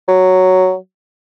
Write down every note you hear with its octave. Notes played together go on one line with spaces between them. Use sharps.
F#3